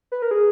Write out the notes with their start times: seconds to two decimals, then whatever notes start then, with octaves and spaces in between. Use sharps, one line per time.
0.12 B4
0.22 A#4
0.31 G#4